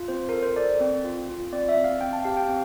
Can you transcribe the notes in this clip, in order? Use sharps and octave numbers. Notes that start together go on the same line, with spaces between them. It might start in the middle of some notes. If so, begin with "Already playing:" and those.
Already playing: F4
C4 C5
A4 A#4
C5
A4 D5
C4
F4
F4
C4 D5
E5
C4
F5
C4 G5
A5
G4 F5
G5
C4